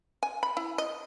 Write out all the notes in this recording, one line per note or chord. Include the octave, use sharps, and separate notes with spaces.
G#5
B5
E4
D#5